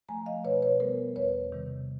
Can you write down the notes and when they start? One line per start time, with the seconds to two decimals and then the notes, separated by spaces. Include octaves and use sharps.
0.09 F3 A3 G#5 A#5
0.26 D#5 F5
0.44 B2 B4 C#5
0.62 B4 C#5
0.80 G3 B3 A#4 C5
1.16 E2 B4 C#5
1.52 C3 D#3 G3